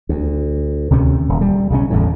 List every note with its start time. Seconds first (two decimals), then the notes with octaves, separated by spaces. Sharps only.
0.09 D2
0.90 D2 C3 D#3 C#4
1.29 D#1
1.41 G3
1.70 B1 C#3 C#4
1.90 G1 E2 A2